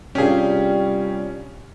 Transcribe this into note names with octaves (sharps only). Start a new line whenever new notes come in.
C3 G3 C#4 D4 F4 G4 G#4